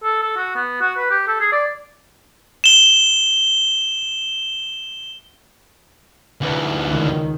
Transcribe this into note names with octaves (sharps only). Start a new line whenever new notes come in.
A4
A4
F#4
B3
F#4
B4
G4
A4
G#4
D5
E7 G7
D2 E3
C#2 D#3